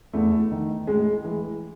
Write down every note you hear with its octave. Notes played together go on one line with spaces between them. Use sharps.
E2 A3
D#3
A2 G#3
E3